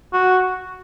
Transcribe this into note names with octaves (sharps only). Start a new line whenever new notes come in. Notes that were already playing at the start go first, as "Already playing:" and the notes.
F#4